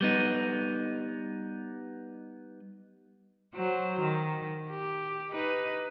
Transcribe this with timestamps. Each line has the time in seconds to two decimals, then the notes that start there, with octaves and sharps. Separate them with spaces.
0.01 G3 B3 D#4
3.55 F#3 C5
4.00 D#3
4.70 G4
5.31 D#4 B4